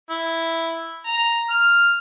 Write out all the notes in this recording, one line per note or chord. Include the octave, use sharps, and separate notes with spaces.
E4
A#5
F6